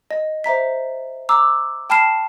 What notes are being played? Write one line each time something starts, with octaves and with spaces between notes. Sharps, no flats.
D#5
C5 E5 A#5 B6
A#5 D6 E6
G5 A5 B5 F6 C7 E7